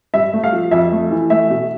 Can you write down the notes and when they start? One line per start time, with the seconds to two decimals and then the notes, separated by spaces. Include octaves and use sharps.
0.14 G2 E5
0.33 A3
0.44 F5
0.52 F3
0.71 F2 E5
0.92 A3
1.11 E3
1.30 A3 E5
1.50 B2